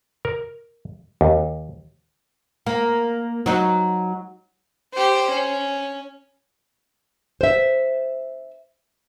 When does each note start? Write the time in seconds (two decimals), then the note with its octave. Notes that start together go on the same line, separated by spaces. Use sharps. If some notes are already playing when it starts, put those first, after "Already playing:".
0.25 A#4
1.21 D#2
2.66 A#3
3.46 F#3 D#4
4.94 G4 C5
5.32 C#4
7.41 C5 E5